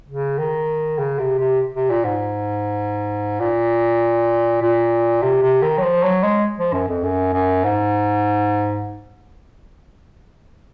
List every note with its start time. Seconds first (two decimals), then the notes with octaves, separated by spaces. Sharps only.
0.08 C#3
0.38 D#3
0.99 C#3
1.19 C3
1.39 C3
1.74 C3
1.90 A#2
2.04 G#2
3.40 A#2
4.62 A#2
5.22 C3
5.42 C3
5.62 D#3
5.78 F#3
5.83 F3
6.03 F#3
6.23 G#3
6.58 F3
6.73 F#2
6.88 F2
7.03 F#2
7.33 F#2
7.64 G#2